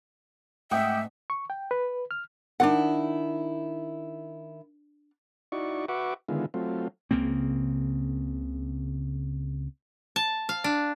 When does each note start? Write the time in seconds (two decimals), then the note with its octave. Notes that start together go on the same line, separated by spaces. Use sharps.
0.71 G#2 A3 C4 E5 F#5 G5 D6 D#6
1.30 C#6
1.50 G5
1.71 B4
2.11 F6
2.60 D#3 D4 E4 F4 F#5
5.52 D#4 E4 F#4 D5 C#6
5.88 F#4 B4 E5 F#5 C#6 D6
6.29 D3 D#3 G#3 B3 E4 F4
6.54 F#3 A3 C4 F4
7.11 C#2 C#3 A#3 C4
10.16 A5
10.49 F5
10.64 D4